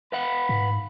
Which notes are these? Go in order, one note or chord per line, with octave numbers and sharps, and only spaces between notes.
B4 F5 F#5 B5
G#2